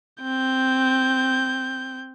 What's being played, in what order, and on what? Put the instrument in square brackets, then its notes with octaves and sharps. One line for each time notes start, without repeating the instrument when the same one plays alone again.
[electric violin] C4 G6